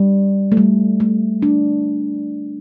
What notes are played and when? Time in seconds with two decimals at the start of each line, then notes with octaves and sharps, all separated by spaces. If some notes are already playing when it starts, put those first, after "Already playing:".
Already playing: G3
0.52 A3
0.57 G3
1.00 A3
1.42 D4